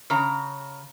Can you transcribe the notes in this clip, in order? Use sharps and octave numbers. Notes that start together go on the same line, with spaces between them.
C#3 A#5